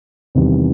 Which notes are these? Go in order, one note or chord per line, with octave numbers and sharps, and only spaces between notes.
E2 C3 D#3 G3